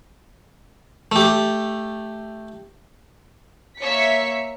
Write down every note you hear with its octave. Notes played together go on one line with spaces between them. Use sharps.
A3 G4
A#3 C#5 E5 B6 C#7